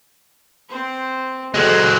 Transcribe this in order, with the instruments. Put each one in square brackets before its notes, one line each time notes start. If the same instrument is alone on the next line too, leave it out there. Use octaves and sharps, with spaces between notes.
[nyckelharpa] C4 C5
[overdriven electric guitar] F#3 G#3 [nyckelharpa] A4 C5